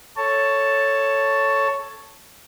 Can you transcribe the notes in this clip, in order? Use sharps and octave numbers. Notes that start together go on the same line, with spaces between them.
A4 C#5 A5